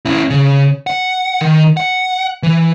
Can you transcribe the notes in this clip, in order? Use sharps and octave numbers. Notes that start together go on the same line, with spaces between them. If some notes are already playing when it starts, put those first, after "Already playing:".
C#4 E4
C#3
F#5
D#3
F#5
E3